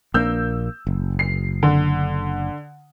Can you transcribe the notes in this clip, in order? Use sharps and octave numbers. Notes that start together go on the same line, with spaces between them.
A#1 A#3 D4 E6 G6
F#1
C7
D3